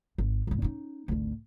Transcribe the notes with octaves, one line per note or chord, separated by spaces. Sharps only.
G#1
C#2 G#2
C#4 D#4
G#1 D2